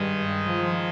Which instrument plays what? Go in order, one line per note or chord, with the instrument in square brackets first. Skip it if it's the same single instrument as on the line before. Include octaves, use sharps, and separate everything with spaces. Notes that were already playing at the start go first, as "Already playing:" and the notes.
Already playing: [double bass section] G2 [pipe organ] D#3 G#3 D#4
[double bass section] F3